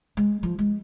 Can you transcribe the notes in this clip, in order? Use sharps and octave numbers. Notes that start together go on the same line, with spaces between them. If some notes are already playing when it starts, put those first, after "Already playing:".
G#3
F3
G#3